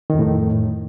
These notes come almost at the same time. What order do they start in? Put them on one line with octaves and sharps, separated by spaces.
D#3 F2 A2